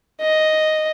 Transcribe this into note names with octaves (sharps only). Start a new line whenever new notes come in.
D#5